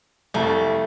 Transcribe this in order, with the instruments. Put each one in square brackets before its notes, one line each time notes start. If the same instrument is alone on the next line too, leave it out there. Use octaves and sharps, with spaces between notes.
[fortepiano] C2 F2 [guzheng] A3